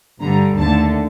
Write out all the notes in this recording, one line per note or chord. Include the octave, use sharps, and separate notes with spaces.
G2 D3 G3 A#5
D#2 D3 A3 A5